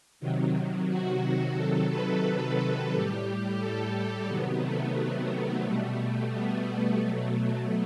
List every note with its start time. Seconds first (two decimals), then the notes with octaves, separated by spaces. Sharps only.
0.20 C3 D#3 F#3
0.89 F#4
1.22 F#4
1.56 C3 D#3 F#3 A4
1.89 B4
2.25 A4
2.92 A2 G3 G4
3.60 A4
4.28 C3 D#3 F#3 B3
4.63 A3
5.64 B2 G3
6.32 B3
7.00 B2 F#3 A3